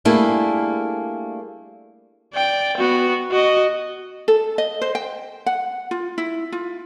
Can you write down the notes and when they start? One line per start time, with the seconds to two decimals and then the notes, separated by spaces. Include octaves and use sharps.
0.05 G3 A3 A#3 D4 E4 G#4
2.34 D5 G5
2.77 B3 F#4
3.31 F#4 D#5
4.28 A4
4.58 D#5
4.81 C5
4.95 G5
5.46 F#5
5.91 F4
6.18 E4
6.52 F4